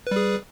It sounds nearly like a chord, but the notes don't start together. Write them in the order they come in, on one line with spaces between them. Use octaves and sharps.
B4 G3 G#4